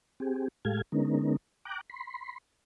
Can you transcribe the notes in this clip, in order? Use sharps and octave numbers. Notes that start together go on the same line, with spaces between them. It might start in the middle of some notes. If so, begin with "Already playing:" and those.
C4 G4 G#4
A2 G#3 G4 A4 F5 G#6
D3 G#3 B3 C#4 D#4 A#4
G5 A#5 D6 F#6
B5 C6